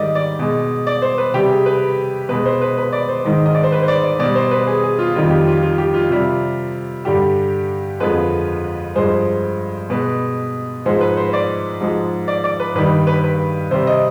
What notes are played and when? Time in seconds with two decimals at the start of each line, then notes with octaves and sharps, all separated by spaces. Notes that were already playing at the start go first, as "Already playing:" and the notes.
Already playing: G#2 D#3 G3 D5 D#5
0.15 D5
0.39 B2 G#3
0.87 D5
1.02 C5
1.18 B4
1.34 C3 G3 G4
1.50 G#4
1.66 B4
2.29 B2 G#3 B4
2.45 C5
2.62 B4
2.77 B4
2.92 D5
3.09 C5
3.25 G#2 D#3 G#3
3.46 D#5
3.55 D5
3.63 C5
3.72 B4
3.82 C5
3.88 D5
4.04 D5
4.19 B2 G3 D5
4.35 C5
4.51 B4
4.67 G#4
4.83 G#4
4.99 F4
5.15 F2 D#3 G3 F4
5.31 G4
5.46 F4
5.63 F4
5.78 G4
5.94 F4
6.10 C3 G3 F4
7.05 G2 D3 G3 G4
8.00 F2 D3 F3 G#3 B4
8.95 G2 F3 G#3 C5
9.90 B2 G#3 B4
10.86 G#2 F3 G#3 C5
11.01 B4
11.17 C5
11.33 D5
11.81 G#2 F3 G#3
12.28 D5
12.44 D5
12.60 B4
12.75 G2 D#3 G3 B4
13.07 B4
13.23 B4
13.71 C3 G3 C5
13.87 D#5